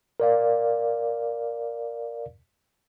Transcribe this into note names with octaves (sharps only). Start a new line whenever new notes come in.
A#4 D5 F5